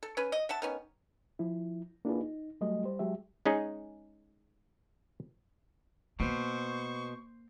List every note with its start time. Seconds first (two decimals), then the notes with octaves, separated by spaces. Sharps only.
0.03 A4
0.17 C#4 B4
0.32 D#5
0.49 E5 F#5 A5
0.62 D#3 B3 C#4
1.39 F3 E4
2.05 A#3 D4 E4 F4 G#4 B4
2.20 D#4
2.61 F#3 G3 A3 D#5
2.84 G3 C5
2.99 F#3 G#3 G4 E5
3.45 G#3 C#4 D#4 G#4
6.20 B2 A#3 C5 C#6